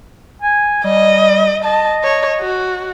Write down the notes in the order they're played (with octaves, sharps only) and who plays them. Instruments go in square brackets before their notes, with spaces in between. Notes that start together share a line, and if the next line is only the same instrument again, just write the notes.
[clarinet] G#5
[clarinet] G3 [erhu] D#5
[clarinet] D#5 [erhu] A5
[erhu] C#5
F#4